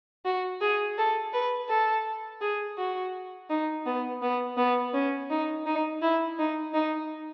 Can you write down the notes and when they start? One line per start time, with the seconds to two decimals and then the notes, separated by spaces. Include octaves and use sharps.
0.25 F#4
0.61 G#4
0.98 A4
1.33 B4
1.69 A4
2.42 G#4
2.78 F#4
3.50 D#4
3.86 B3
4.22 B3
4.58 B3
4.94 C#4
5.30 D#4
5.66 D#4
6.02 E4
6.39 D#4
6.74 D#4